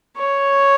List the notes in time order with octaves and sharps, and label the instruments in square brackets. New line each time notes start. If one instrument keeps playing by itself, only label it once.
[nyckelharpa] C#5